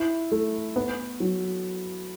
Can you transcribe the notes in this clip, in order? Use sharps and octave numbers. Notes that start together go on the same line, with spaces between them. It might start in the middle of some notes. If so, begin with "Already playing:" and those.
Already playing: E4
A3
B3
F#3